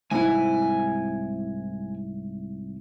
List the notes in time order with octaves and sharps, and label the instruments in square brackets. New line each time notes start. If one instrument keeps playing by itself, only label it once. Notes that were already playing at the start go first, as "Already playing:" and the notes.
[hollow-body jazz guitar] C2 G#2 E4 [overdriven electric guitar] G#5